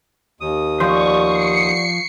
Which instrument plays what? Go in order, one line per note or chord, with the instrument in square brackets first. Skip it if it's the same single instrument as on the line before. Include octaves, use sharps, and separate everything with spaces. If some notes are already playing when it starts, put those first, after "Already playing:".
[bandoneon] D#2 D#6
[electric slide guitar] F3 C5 [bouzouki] G3 B3 [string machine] C#6
[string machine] C7 C#7